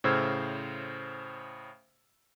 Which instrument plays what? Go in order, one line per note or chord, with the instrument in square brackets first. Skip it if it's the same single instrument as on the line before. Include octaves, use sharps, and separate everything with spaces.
[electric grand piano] A2 C#3 C5 E6 F6 G#6